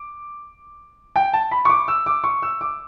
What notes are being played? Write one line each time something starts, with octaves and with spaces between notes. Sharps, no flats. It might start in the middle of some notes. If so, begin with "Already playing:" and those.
Already playing: D6
G5
A5
B5
C#6
D6
E6
D6
C#6
E6
D6